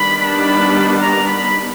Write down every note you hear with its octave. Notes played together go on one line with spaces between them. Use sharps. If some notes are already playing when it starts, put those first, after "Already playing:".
Already playing: D#3 G3 B3 D4 B5
B5
A#5
B5